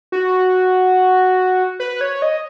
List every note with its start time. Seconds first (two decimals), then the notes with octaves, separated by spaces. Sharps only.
0.12 F#4
1.80 B4
2.01 C#5
2.22 D#5